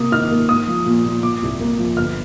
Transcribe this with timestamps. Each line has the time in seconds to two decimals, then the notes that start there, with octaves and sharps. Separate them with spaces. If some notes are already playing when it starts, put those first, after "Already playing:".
Already playing: C3 A#3 D#6
0.12 D#3 F6
0.31 A#3
0.49 A#3 D#6
0.68 F3
0.86 A#2
1.05 A#2
1.23 A#2 D6
1.42 C2
1.60 A#3
1.78 F3
1.97 G1 F6